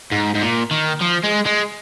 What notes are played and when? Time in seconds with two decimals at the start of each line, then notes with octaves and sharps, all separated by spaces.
0.12 G#2
0.35 G#2
0.42 A#2
0.71 D#3
1.01 F3
1.23 G#3
1.45 G#3